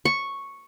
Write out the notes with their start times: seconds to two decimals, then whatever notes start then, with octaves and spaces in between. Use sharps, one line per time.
0.05 C#6